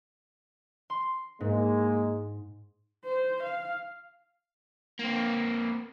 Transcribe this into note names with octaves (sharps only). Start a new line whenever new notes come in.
C6
G#2 G#3 A#3
C5
F5
A#3 C4